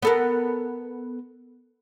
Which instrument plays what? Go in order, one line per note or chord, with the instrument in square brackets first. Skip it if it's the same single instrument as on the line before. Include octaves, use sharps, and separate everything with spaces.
[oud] B3 A4 A#4